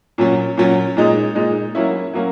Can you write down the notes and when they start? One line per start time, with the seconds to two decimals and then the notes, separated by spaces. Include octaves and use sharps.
0.18 A#2 F#3 C#4
0.57 A#2 F#3 C#4
0.97 A#2 G#3 D#4
1.35 A#2 G#3 D#4
1.75 F#3 A#3 C#4 E4
2.14 F#3 A#3 C#4